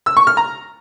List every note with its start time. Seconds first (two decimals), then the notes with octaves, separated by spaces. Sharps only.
0.06 E6
0.17 C#6
0.27 F6
0.37 A#5